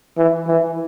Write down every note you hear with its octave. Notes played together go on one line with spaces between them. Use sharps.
E3
E3